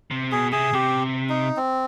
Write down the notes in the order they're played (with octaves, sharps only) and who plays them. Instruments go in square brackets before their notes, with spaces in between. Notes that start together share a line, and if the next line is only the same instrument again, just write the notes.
[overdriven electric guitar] C3
[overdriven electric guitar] B2 [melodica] G#4
[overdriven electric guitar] C3 [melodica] G#4
[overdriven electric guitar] C3 [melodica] G4
[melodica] D#4
C4